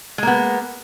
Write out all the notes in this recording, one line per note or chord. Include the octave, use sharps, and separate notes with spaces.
G#3 A#3 B3